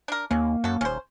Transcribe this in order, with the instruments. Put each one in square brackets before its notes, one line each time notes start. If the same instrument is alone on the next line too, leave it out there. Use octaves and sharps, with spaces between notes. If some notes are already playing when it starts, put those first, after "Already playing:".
[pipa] D4 A#4
[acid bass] D#2 [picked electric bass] A#3 [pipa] C#4
[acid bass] F#2 [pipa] F#4 A4
[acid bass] D#1 [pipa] C#4 C5